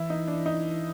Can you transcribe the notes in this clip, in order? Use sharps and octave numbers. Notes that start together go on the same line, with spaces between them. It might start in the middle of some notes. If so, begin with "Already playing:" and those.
Already playing: E3 E4
D#4
D4
D#4